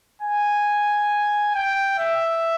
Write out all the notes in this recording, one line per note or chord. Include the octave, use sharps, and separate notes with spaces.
G#5
G5
E5